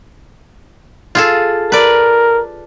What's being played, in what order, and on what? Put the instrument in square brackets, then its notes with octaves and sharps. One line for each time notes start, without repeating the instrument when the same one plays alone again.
[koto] F4 G#4 A4
[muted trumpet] A#4 [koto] B4 D5